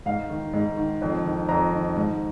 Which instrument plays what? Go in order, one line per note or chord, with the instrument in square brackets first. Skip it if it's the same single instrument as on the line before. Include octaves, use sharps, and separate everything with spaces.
[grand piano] G#2 F5
D#3
G#2
D#3
F2
D#3
F2 A#5
D#3
G#2